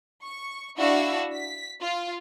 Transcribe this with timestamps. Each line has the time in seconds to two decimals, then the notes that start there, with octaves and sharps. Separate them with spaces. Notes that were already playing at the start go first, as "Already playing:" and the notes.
0.22 C#6
0.77 D4 E4 F#4 E5 F5
1.34 B6
1.80 F4